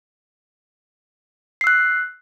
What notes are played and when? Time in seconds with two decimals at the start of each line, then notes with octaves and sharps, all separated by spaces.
1.61 C7
1.64 E6
1.67 F#6